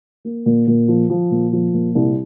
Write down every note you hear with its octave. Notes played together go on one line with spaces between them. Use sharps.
A#3
A#2
A#2
F3
F3
A#2
F3
A#2
C2